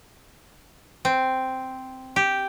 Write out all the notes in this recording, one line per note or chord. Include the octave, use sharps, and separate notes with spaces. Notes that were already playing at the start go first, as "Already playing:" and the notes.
C4
G4